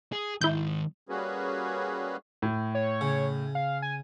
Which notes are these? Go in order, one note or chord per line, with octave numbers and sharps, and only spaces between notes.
G#4
D#3 G#3 E4 G6
G3 A#3 C#4 F#4 G#4 B4
A2
C#5
C#3
F5
G#5